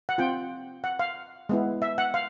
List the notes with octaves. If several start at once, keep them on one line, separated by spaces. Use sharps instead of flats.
F#5
C4 F4 G5
F#5
F5
G#3 B3 E4
E5
F#5
F5